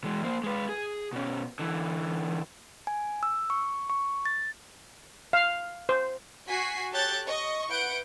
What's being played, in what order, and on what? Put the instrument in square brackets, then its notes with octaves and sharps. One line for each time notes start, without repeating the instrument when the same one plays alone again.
[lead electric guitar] E3 G#3
A#3 C5
G#3 B4
G#4
B2 C#4
D3 E3
[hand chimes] G#5
E6
C#6
C#6
A6
[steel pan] F5
C5
[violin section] F#4 G#5 B6 C7
G4 A4 C#5 F#6 G6 A6
D#5 C#6
E4 B4 F#5 G6 D7